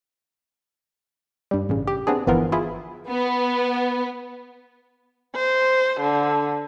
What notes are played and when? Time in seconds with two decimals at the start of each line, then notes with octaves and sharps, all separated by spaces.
1.51 G2 G3
1.69 A1 C#3
1.87 G4
2.07 B3 C4 D4 G#4
2.27 G1 E3 F3 B3 F4 A#4
2.52 E4 F4 G#4
3.09 B3
5.35 C5
6.00 D3